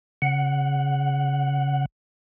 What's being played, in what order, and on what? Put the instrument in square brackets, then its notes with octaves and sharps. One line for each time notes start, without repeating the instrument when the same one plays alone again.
[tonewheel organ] C#3 F#5